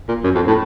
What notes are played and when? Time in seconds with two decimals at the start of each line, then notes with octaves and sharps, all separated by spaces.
0.08 A#2
0.24 F#2
0.35 F2
0.47 A2